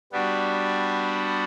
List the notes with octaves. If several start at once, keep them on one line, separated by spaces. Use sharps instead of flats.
G3 B3 D4 F#4